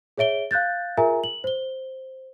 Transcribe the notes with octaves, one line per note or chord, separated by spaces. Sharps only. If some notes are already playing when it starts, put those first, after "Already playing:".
G#4 C#5 E5 D7 G7
F5 F#6 G6 A6
F4 G#4 A#4 E5 G#5 A#5
F#7
C5 G7